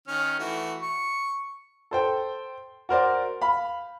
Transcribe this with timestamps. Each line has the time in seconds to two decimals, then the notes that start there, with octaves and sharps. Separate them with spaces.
0.08 D#3 C#4 F6
0.39 E3 A3 F#4
0.81 C#6
1.91 A4 C5 G5
2.89 F#4 A#4 C5 D5
3.42 F5 B5